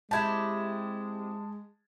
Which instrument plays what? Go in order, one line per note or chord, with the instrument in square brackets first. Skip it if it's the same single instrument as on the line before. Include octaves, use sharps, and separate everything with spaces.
[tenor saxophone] G#3 [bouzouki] C4 E4 G4 [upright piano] A5 G#6